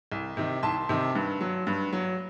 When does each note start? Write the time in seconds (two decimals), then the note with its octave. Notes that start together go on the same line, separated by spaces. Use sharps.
0.12 C2
0.37 C3 D#3
0.63 C2 A5 C6
0.89 C3 D#3
1.15 G2
1.41 F#3
1.67 G2
1.93 F#3